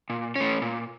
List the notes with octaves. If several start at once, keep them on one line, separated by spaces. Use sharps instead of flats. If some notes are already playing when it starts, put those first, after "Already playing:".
A#2
A3 C#4
A#2